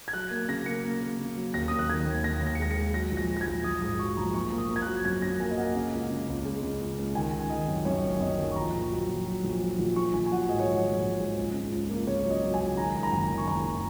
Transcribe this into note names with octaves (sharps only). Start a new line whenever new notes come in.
G#6
F#3 F#6
A#3
C#3 A#6
A#3 C#7
A#3
A#3
C#3
F#3
D#2 A#6
D#2 D#6
F#6
D#3 G#6
D#2
D#2 A#6
D#2
A#6
C#7
G#3 A#6
C#7
G#3
F#3 A#6
A#1
A#6
F#3
A#6
G#6
A#1
A#1 D#6
G#2 D#6
F#3 C#6
A#1 A#5
A#3 C#6
A#3
D#6
A#3
G#6
F#6
F#3
F#2 G#6
F#2 A#6
A#3 G#5
D#5
A#3 F#5
C#3 D#5
C#2
C#3
C#2
G#3
C#3
C#2
C#2
D#3 G#5
D#3
D#3 D#5
F#2
F#2 C#5
F#1
F#2 D#5
D#3
C#6
A#1 A#5
A#2
F#3
A#1
F#3
A#1
F#3
A#1
A#1 C#6
A#1 G#5
G#5
F#3 F#5
G#2 D#5
C#5
A#1 D#5
A#1
A#1
G#2
C#2
C#3
C#2
A#3
C#3 C#5
F#3
D#5
F#3
G#5
C#2
D#3 A#5
D#3
A#5
F#1 G#5
D#3
C#6
F#1 A#5